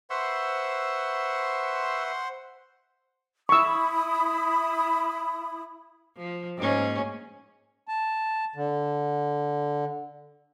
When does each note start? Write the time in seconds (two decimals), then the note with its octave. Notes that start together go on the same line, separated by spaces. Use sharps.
0.10 B4 C5 E5 F#5 C6 C#6 E6
3.49 E4 B5 C#6 D#6 E6
6.17 F3
6.57 G#2 A#3 C#4
7.88 A5
8.56 D3